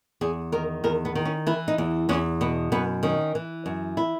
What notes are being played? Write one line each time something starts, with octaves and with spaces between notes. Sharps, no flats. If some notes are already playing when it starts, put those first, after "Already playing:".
E2 G#4
D#3 A#4
E2 A#4
B3
D#3
C#4
E3 E4
D#4
E2
E2 C#4
B2 B3
F#2 B3
D#3 C#4
E3
F#2
E4